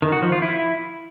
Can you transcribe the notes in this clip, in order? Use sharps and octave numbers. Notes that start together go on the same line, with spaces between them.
D#3
F#4
F3
F4
E4